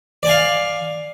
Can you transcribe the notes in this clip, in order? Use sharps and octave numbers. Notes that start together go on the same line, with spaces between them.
D5 F5 G#5